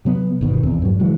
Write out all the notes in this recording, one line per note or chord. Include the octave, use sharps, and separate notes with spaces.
C3 F#3 B3
G1 B2 D#3
E2 C4
G2 A#2 F#3
C#3 E3 F#3 G#3